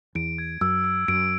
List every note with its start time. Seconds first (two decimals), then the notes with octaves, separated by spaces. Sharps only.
0.15 E2 D7
0.38 G#6
0.61 F#2 E6
0.84 E6
1.08 F#2 D7